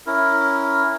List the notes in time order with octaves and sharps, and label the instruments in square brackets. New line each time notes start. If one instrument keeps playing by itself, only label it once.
[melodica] C#4 E4 A#4